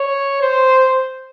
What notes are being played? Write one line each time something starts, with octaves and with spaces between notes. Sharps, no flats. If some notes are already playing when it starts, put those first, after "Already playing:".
Already playing: C#5
C5